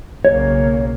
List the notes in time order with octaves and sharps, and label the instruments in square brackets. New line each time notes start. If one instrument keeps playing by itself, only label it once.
[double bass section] B1 C#3 A#3 [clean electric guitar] C#5